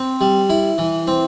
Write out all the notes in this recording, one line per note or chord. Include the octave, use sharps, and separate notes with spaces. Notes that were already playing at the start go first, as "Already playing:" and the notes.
Already playing: C4
G3
E4
E3
C4